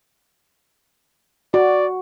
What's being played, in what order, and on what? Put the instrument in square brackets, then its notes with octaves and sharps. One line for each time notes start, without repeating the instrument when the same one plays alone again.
[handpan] F#4 [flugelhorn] D5